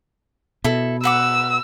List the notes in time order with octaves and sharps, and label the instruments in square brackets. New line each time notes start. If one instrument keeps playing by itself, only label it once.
[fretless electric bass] B2 [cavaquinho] E4 A4
[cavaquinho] B4 F#5 D6 [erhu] E6